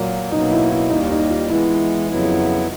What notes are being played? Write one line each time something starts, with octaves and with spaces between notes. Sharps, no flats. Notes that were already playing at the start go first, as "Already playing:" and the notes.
Already playing: A#2 F#3 A#3
B2 F#3 A#3 D#4
E4
E4
D#2 D#3 G3 A#3 D#4
D#4
F4
E3 G#3 B3 E4
F2 C#3 F#3 B3 E4